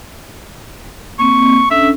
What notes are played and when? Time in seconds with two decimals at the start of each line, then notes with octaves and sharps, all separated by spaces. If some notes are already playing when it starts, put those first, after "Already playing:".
1.19 A#3 C4 C#6
1.71 C#4 D4 A4 E5